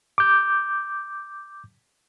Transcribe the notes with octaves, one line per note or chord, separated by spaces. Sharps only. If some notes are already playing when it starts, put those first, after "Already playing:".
D6 G6